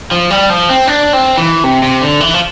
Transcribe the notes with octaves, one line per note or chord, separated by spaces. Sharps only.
F3
G3
F3
C4
D4
C4
E3
C3
C3
D3
E3
F3